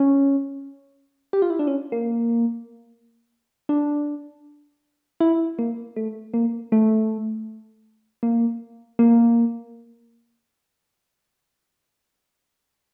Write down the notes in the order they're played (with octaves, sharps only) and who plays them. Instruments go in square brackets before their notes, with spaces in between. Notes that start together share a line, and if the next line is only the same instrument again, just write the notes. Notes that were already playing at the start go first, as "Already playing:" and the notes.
Already playing: [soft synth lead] C#4
G4
F4
E4
D4
C#4
A#3
D4
E4
A#3
A3
A#3
A3
A#3
A#3